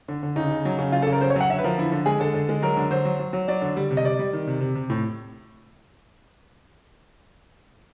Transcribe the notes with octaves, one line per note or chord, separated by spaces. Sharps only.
D3
D3
C#3 D#4
C#3
F#3
C#3
F#3 F4
A4
C#3
A#4
F#3 C5
C#5
F#3
F#5
D3 E5
B4
F3 A#4
D3 E4
D3
G#3 G#4
D3 A4
D3
G#3
F#3 A#4
D3
F#3 C5
F#3
F#3
F#3
F#3 D5
D3
G3
C3
D#5
G3 D5
G3
D#3
C3
C3
C3
A2